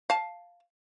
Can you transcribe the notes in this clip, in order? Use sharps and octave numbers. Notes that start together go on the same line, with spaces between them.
F5 A5